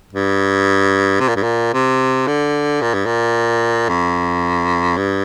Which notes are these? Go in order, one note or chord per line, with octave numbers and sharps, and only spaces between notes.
G2
C3
A#2
G2
A#2
C3
D3
A#2
G2
A#2
F2
G2